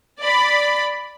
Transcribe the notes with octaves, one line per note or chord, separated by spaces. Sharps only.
D5 B5